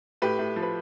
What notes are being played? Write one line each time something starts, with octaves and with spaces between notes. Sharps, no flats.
A2 G4 B4
A2
F3
B4